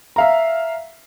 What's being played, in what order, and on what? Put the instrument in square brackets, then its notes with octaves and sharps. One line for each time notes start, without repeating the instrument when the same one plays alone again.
[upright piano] E5 F5 A#5